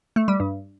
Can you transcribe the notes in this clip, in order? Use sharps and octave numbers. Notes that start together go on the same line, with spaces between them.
A3
G3
G2